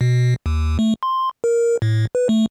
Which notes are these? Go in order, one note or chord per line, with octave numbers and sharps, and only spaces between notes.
B2
D#2
A3
C6
A#4
A2
B4
A3